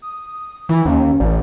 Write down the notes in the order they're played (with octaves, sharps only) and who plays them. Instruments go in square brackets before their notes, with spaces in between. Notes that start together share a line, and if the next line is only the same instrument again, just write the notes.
[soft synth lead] D#6
[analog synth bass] E3 [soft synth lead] E4
[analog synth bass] D#2 [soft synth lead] C#4
[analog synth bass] A1 [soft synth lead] D5